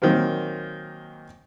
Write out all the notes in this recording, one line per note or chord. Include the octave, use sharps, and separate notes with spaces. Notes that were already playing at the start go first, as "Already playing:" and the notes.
A#2 D#3 F#3 A#3 C4